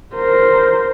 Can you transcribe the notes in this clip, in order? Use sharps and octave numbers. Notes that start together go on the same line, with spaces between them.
A#4 C5